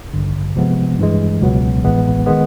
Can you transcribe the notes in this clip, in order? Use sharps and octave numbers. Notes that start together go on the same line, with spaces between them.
A1 G2 D3
C3 F3 G#3 B3
G2 E3 G#3
C#2 B2 F#3 B3
A1 A2 E3 G#3 B3
D#3 G#3 B3